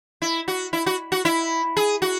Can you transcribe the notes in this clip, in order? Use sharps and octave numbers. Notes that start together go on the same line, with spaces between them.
E4
F#4
E4
F#4
F#4
E4
G#4
F#4